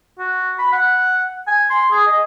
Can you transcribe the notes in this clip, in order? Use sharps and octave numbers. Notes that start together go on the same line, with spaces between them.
F#4
B5
F#5
G#5
C6
G#4
D#5